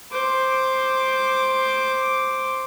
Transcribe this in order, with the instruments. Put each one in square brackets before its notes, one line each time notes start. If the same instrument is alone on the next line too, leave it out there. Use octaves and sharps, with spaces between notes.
[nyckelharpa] C5 D6